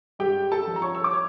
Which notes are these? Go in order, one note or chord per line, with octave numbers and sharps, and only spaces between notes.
G2 G4 G5
A4 A5
F3
A#5
C#5 C#6
E6
D6
C#5